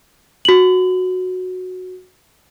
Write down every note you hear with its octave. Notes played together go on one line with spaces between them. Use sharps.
F#4 F#7